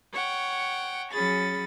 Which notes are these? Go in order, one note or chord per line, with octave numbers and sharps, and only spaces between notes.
C#5 F#5 G5
F#3 C#4 G#4 B5 A6